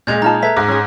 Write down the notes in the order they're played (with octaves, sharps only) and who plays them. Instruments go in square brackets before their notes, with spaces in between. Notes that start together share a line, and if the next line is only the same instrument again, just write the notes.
[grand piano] A#2 G#3 [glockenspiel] G6 G#6 F7
[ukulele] D#4 F4 A5 [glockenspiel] A#5 F6
[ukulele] A4 B4 E5 [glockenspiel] A#5 G#6 B6
[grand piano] G#2 [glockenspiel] A#5 D6 F#6
[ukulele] C#4 G#4